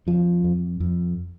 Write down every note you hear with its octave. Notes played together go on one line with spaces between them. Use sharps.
F2 F3
F2
F2